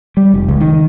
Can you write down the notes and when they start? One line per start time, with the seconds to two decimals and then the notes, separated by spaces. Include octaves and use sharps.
0.17 G3
0.34 F1
0.49 C#2
0.61 D#3